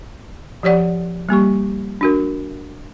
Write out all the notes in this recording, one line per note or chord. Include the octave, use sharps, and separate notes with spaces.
F3 G4 C#5 D5 F#5
G3 A#3 G4 C#6
D4 F#4 A#4